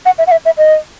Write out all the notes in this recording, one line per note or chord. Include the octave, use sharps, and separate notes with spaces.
F#5
E5
F#5
E5
E5
D#5